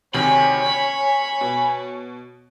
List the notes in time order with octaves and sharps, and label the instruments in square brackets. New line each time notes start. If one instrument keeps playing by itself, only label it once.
[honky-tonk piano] D2 C3 D#3 [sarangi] C#5 [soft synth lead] G#5 [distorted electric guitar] B5
[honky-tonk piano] C#4
B2